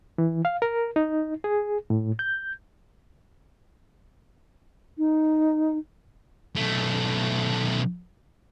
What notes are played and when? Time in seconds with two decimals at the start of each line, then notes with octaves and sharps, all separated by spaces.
0.18 E3
0.45 F5
0.62 A#4
0.96 D#4
1.44 G#4
1.90 A2
2.19 G6
4.98 D#4
6.56 B1 A3